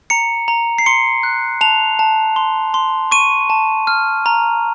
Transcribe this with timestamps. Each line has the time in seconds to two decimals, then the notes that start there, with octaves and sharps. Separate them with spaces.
0.10 A#5 C#7
0.48 A#5
0.79 C7
0.86 C6 C#7
1.23 F#6
1.61 A5 F7
1.99 A5
2.36 C6
2.74 C6
3.11 C#6 D#7
3.50 A5
3.87 F6
4.26 A#5